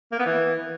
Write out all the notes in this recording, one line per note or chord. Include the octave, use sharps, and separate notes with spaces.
A#3
B3
E3